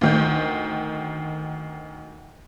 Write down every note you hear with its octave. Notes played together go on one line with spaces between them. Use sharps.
D2 D#3 G6